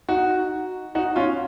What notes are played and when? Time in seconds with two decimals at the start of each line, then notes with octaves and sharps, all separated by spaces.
0.09 D#4 F#4
0.95 D#4 F#4
1.16 C#4 F4